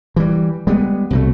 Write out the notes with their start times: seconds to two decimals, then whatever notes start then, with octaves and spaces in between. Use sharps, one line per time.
0.16 E3 G3
0.67 G3 G#3 B3
1.10 C2 B2 A3